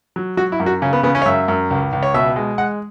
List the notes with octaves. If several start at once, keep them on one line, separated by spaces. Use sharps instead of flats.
F#3
F#3 F#4
E4
F#2
F#4
C#3 C#4
B3
C#3 B3
C#4
C#5
F#2 E5
F#2
C#2
C#2
C#5
B2 E5
G#3
G#3 F#5